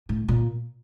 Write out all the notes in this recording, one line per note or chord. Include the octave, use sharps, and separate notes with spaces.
A2
A#2